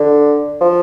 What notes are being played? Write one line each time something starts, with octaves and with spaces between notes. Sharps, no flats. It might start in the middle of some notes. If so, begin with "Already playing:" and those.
Already playing: D3
F3